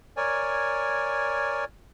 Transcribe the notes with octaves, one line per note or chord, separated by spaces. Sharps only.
A#4 C#5 D5 G#5